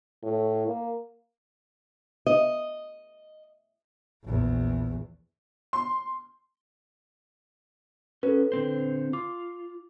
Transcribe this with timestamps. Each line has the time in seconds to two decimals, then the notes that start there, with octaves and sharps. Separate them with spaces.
0.23 A2
0.67 A#3
2.27 D#5
4.24 A#1 E2
5.73 C6
8.23 C#4 F#4 A4 B4
8.52 D3 C4 C5
9.13 F4 D6